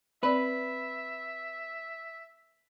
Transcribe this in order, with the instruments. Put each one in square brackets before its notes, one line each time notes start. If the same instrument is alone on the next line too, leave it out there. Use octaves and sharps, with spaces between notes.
[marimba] C4 D5 [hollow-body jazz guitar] B4 [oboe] E5